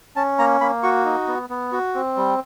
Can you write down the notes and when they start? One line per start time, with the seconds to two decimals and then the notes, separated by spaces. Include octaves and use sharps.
0.16 C#4 A5
0.39 A#3 A#5
0.61 A#3 B5
0.83 F#4 C#6
1.05 D#4
1.27 B3
1.50 B3
1.72 F#4
1.95 C4
2.17 G3